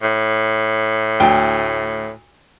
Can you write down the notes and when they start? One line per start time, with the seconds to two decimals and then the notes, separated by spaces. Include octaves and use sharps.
0.02 A2
1.20 D2 G5